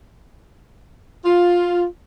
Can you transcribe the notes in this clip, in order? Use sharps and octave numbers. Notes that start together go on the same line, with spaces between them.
F4